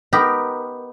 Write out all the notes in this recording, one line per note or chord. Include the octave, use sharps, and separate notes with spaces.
B3 D#4 G4 A#4